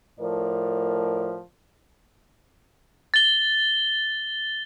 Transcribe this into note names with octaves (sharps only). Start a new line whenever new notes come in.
A2 F3 A#4 D5
A6 G7